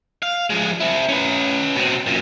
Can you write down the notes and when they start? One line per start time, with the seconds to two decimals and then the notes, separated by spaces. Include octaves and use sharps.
0.23 F5
0.50 F3 G#3
0.80 C4 E4
1.09 C#4 B4
1.76 B2 C4
2.07 F#2 A#2